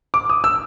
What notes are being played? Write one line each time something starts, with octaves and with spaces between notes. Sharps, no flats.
D6
D#6
E6